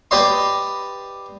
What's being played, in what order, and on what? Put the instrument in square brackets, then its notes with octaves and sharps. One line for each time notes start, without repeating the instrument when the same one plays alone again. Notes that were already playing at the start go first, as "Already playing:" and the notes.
[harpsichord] G4 B4 D5 D#5 C6